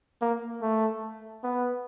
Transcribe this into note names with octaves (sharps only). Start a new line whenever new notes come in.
A#3
A3
B3